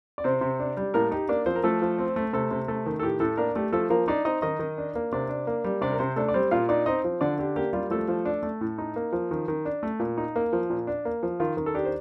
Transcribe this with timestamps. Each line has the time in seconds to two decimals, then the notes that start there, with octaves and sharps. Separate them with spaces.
0.18 D5
0.24 C3 C4 C5
0.41 C3
0.59 D4
0.77 G3
0.94 A2 A#3 A#4
1.11 D#4 G4
1.29 A#3 D4 D5
1.46 F3 C4 C5
1.56 A#4
1.63 F3 A3 A4
1.82 F3
1.98 C4
2.16 A3
2.33 C3 A3 A4
2.51 C3
2.68 A3 A4
2.86 D#3
2.99 A4
3.02 A2 G4
3.20 A2 A3 A4
3.37 A#3 D4 A#4
3.55 A3 G4
3.72 F3 A3 A4
3.90 F3 A#3 A#4
4.08 D4 D#4 D5
4.25 C4 D#4 D#5
4.42 D#3 D#4 D#5
4.59 D#3
4.78 D4
4.95 A#3
5.12 C3 D4 D5
5.29 D4
5.47 A#3
5.64 G3
5.81 C3 D4 D5
5.92 A#4
5.99 C3 C4 C5
6.16 A3 D4 A4
6.28 D5
6.34 G3 C4 C5
6.51 A#2 F4 F5
6.69 D4 D#4 D5
6.86 C4 D#4 D#5
7.04 F3
7.21 D3 D4 D5
7.38 D4 G4
7.56 A#3 G4
7.73 G3 F4
7.90 F3 A3 A4
8.08 F3
8.25 D4
8.43 A3
8.61 A2
8.78 D#4
8.96 A#3
9.12 F3
9.31 D#3
9.48 D#3
9.65 D4
9.83 A3
10.00 A#2
10.18 D#4
10.36 A#3
10.53 F3
10.70 A#2
10.87 D4
11.05 A#3
11.23 F3
11.40 D#3 F4
11.57 D#3
11.66 A4
11.75 D4 G4
11.85 C5